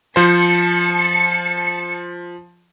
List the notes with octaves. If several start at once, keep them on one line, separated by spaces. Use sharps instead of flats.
F3 C5 A5 C#7